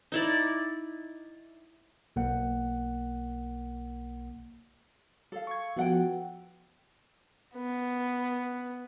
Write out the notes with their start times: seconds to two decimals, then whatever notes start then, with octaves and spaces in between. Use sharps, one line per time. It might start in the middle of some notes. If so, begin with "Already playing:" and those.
0.12 D#4 E4 D5
2.16 B1 A#3 F#5
5.32 A4 F5
5.47 C#6 G#6
5.76 F3 B3 F#4 A4 F#5 G5
7.55 B3